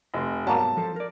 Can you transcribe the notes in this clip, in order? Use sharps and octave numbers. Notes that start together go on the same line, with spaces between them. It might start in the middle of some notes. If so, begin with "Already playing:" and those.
F1 D#5 C6
G#2 F#3 G3 A#3 B3 A5
F3 A4 C5
A#4 D5